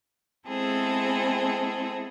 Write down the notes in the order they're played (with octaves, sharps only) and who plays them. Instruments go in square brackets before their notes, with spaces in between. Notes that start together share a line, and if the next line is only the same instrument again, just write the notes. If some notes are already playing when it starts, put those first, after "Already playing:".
[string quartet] G#3 B3 C4 E4 G#4 A4